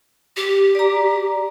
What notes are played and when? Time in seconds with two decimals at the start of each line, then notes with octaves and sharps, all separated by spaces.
0.37 G4
0.75 D5 A#5